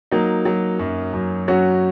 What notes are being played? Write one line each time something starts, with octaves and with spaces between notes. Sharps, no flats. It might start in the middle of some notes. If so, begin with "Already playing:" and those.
F#3 A#3 D#4
F#3
F#2
F#2
F#3 C#4 F#4